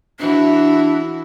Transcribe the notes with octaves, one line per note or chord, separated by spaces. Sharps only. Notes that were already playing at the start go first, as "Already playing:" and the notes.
E3 D4 E4 F#4